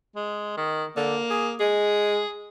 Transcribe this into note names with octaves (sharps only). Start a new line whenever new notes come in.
G#3
D#3
D3 A#3
G#4
G#3 G#4